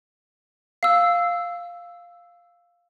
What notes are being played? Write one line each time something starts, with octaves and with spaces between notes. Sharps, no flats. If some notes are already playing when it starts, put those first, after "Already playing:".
F5 E6